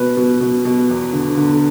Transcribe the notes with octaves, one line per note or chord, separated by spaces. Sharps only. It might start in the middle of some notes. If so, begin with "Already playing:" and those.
Already playing: B2 B4
B2
B2
B2
E2
D3
D3